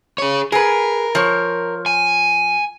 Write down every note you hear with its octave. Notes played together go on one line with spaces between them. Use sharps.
G#4 C#5
G#4 A#4 B4
F3 C#5
G#5